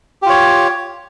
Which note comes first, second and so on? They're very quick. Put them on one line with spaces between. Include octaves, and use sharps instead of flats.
G4 F4 C#5